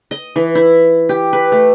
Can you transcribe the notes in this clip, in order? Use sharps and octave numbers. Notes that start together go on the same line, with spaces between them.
D#5
E3
E4
G4
B4
A3